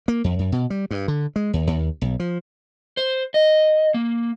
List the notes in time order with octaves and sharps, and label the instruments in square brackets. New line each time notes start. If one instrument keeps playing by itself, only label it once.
[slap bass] A#3
F2
F#2
B2
G3
G2
D3
G#3
D#2
D#2
B1
F3
[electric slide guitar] C5
D#5
A#3